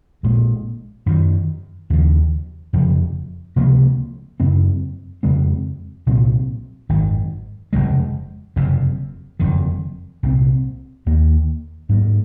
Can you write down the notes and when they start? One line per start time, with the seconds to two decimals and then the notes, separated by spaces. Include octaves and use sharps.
0.23 A#1 A#2 G#3
1.06 F#2 D#3 F#3
1.90 D#2 C#3 F3
2.73 F1 F2 C#3 F3
3.56 C#2 C3 F3 A#3
4.40 F#2 C#3 F#3 C4
5.23 F2 C#3 G#3 C4
6.06 C2 A#2 F#3 C4
6.89 G#1 F#2 D#3
7.73 F1 D#2 C#3 G#3
8.56 F#1 F2 C3
9.39 F#1 F2 D#3
10.23 C2 A#2 F3 C4
11.06 D#2 D#3 A#3
11.89 G#2 F#3 A#3